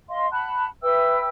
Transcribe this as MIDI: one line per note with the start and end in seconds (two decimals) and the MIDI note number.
0.09 0.26 75
0.09 0.26 77
0.09 0.26 84
0.31 0.66 78
0.31 0.66 81
0.31 0.66 83
0.31 0.66 90
0.82 1.27 71
0.82 1.27 76
0.82 1.27 79
0.82 1.27 88